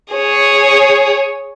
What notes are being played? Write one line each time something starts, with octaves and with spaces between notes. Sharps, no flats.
G#4 C#5